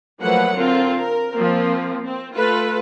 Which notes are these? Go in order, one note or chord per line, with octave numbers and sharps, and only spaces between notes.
F3 F#3 A3 A#3 B4 F#5
D3 C4 F4 A#4
A#4
F3 A#3 C4
C4
A3 F4 A4 B4